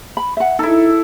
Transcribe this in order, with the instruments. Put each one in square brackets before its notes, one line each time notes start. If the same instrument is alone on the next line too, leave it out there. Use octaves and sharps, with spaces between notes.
[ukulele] B5
E5 F#5
[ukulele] D#4 [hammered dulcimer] E4 A4